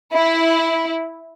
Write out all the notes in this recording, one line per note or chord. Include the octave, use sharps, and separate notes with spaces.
E4